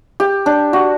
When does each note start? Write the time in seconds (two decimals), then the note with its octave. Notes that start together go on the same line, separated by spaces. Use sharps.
0.20 G4
0.46 D4
0.73 F#4